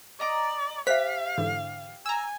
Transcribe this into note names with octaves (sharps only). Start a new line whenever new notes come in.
D5 D#5 A#5 D6
G4 C5 E5 F5 B6
G#2 D3 E3
G#5 A#5 E6